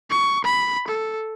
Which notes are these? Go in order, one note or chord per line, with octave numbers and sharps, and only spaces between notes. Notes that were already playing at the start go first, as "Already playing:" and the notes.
C#6
B5
A4